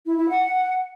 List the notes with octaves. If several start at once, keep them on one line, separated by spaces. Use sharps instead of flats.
E4
E4
F#5